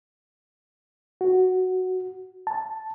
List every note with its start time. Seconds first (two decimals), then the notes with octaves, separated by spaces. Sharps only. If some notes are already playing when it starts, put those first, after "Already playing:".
1.21 F#4
2.47 A5